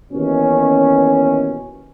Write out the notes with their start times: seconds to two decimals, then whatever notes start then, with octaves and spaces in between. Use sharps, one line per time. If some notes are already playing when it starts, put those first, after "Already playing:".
0.12 D#2 B2 E3 C#4